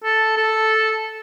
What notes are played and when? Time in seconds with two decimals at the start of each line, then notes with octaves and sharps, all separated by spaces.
0.04 A4
0.37 A4